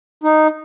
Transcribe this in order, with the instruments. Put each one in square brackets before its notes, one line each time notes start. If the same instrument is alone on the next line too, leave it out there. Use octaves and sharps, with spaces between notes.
[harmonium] D#4